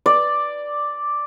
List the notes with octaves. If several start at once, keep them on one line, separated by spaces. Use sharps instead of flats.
D5